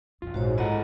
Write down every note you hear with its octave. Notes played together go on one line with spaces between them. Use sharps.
B1 F2 F4
A#1 G#2 F#4 C5 C#5
A#3 E4 F4 A4 D#5 F#5 A#5